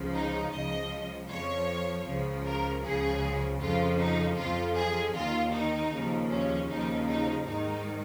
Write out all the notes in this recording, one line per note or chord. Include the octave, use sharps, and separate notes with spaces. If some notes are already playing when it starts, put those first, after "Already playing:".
Already playing: C#2 C#3 F3
D#4
C#2 C#3 F3 D#5
F2 F3 C#5
C#2 C#3 F3
A#4
C#2 C#3 F3 G#4
F2 C#3 F3 F4
D#4
F2 F3 F4
G#4
D#2 D#3 F4
D#4
D#2 C#3 F3
C#4
D#2 C#3 F3 D#4
D#4
G#2 D#3 D#4